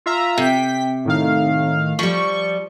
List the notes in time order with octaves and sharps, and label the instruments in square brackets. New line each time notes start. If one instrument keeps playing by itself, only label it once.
[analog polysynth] F4 E5 A#5
[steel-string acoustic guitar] C3 [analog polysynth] G5 B6
[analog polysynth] A2 D#3 F5
[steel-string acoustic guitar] F3 G3 [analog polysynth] C#6